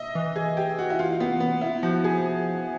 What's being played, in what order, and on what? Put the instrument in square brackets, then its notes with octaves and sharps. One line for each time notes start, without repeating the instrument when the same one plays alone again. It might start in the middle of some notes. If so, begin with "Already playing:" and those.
Already playing: [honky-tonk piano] D#5 E5
[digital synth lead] E3
[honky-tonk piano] G#4
G4
F#4
E4
F4
B3
B3
E4
[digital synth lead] F3 [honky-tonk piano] F#4
[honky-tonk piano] G#4